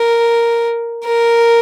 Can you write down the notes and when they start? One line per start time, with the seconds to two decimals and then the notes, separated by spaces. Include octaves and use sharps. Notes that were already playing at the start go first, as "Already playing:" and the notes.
Already playing: A#4
1.05 A#4